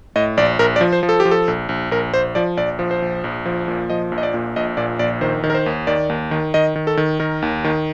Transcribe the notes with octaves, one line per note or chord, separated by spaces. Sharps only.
A2 D#5
A#1 D5
A#1 A#4
D5
F3
C5
F3
A4
G4
F3
A4
A#1
A#1
A#1 A#4
A#1 C5
F3 D5
A#1 D5
F3
C5
A#1
A#1
F3
A#2
F3 D#5
A#1
D#5
D5
A#2
A#1 D#5
A#2 D5
A#1 D5
D#3 C5
D#3
A#4
C5
D#2
D#3 D5
D#2
D#3
D#3 D#5
D#3
A4
D#3
D#3 A#4
D#2
D#3